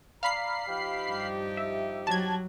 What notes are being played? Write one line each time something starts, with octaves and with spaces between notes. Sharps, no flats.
D5 F5 A#5 B5 C7
F3 D#4 G4
G2
E5
F#3 A5 G#6